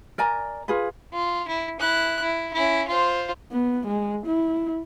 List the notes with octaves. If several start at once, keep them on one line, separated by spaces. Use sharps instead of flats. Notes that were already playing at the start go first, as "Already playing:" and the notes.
A#4 D5 G#5 A#5
F4 G#4 B4
F4
E4
E4 F#6
E4
C#4 E4
F4 C5
B3
G#3
E4